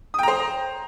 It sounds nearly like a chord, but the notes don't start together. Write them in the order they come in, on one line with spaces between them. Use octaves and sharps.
D#6 G5 A#5 C5